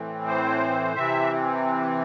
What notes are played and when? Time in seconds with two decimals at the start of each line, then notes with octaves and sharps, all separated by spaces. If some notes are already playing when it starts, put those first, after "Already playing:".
Already playing: A2 E3 C4
0.27 C5
0.96 C3 E3 C4 E5